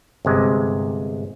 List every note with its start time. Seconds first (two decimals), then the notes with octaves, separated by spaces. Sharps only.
0.25 G1 C3 G#3